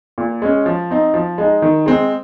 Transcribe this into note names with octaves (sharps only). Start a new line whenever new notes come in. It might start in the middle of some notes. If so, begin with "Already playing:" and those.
A#2
G#3 C#4
F3
C4 D#4
F3
G#3 D#4
D#3
G#3 C4